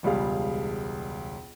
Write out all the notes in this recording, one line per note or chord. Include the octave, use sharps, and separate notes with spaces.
E1 C#2 G3 G#4 F5